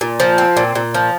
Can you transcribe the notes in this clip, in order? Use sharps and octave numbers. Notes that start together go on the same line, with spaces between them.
A#2
F3
C4
A#2
A#2
F3